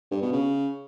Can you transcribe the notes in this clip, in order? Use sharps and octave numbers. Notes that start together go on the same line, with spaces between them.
G2
B2
C#3